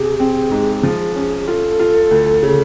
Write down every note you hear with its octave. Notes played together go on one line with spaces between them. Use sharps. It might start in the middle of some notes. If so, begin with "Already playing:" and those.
Already playing: C3 G#4
C4
G#2
F3
C#4
F4 A4
F4
D2
C#3